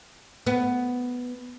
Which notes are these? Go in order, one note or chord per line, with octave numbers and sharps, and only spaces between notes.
B3